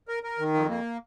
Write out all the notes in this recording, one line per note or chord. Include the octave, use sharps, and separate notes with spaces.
A#4
A#4
D#3
F2
A#3